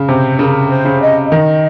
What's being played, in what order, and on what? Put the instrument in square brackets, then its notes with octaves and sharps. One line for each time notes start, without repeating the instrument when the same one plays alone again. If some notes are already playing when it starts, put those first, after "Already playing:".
Already playing: [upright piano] C#3
[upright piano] C3 [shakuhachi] C5
[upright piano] C#3 [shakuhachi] A#4
[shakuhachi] C5
[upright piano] C#3
[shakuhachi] D#5
D#5
[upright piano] D#3